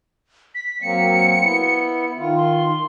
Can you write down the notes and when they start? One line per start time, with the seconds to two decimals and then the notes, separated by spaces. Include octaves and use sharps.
0.55 B6
0.82 F#3 A#3 C4 C#7
1.40 B3 E4
2.17 D#3 F4
2.36 C6